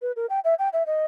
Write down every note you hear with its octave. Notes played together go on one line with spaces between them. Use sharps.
B4
A#4
G5
E5
G5
E5
D#5